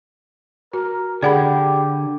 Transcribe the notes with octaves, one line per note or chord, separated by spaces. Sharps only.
F#4 A#4
D3 G4 G#4 D5 F#5 B5